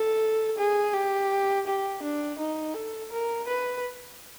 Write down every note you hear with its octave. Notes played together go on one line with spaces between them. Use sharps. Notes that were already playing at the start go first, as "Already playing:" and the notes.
Already playing: A4
G#4
G4
G4
D4
D#4
A4
A#4
B4